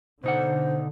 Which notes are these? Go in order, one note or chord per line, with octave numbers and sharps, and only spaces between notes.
B2 D3 D#4 C5 F#5